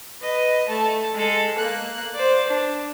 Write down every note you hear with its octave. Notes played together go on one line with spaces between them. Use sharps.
B4 D#5
A3 A5
G#3 A4
A#3 F#6
C5 D5
D4